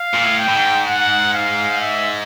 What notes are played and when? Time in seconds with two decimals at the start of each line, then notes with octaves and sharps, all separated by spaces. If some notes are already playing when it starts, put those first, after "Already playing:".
Already playing: F5
0.14 A#2
0.24 A2
0.39 G5
0.49 A2
0.55 G#2
0.87 F#5
1.34 F5
1.81 E5